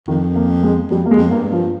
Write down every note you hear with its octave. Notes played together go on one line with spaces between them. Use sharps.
F2 D#3
A#3
G#3
F2 G3
A#3
G#3
F2
G2 A#3
F3